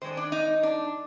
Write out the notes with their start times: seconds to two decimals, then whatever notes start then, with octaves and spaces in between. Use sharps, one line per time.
0.02 D#3 G#3 D4 C5
0.17 D4
0.32 D#4
0.63 D4